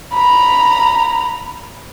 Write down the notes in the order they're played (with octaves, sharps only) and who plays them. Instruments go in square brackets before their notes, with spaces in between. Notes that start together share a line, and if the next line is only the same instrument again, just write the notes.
[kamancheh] A#5 B5